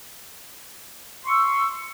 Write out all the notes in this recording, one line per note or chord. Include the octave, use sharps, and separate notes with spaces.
C6 C#6 E6